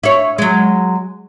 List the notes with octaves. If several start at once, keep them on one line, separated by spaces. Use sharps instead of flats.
E4 C#5
F#3 G#3